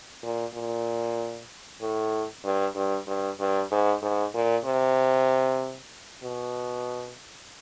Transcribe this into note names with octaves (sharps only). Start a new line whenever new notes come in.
A#2
A#2
A2
G2
G2
G2
G2
G#2
G#2
A#2
C3
B2